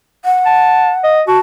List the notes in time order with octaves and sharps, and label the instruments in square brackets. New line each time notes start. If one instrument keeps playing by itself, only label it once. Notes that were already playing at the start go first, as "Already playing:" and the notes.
[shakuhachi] F#5
[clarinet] A5
D#5
[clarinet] F#4 [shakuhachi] A5